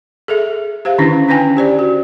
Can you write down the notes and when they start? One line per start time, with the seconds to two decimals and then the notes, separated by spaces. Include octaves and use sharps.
0.28 G#4 A4 E5
0.85 G4 C5 F5
0.98 D3 D#3 C#4 D4 E4
1.29 C#4 D4 B4 G5 G#5
1.57 G4 C5 D5
1.79 F#4